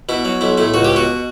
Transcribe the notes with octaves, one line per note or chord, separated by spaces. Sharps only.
B2 E4
F#3
B1 E4
A2 E4
C#2 F#4
G4
B2
F#4